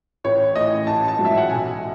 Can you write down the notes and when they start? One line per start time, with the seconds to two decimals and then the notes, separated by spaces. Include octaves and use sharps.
0.24 A1 C#5
0.56 A2 E3 D#5
0.87 A1 A5
1.08 A5
1.18 G#2 F#3
1.25 E5
1.37 F#5
1.50 B1 G#5